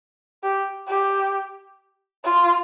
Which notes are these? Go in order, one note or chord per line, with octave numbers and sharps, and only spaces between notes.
G4
G4
F4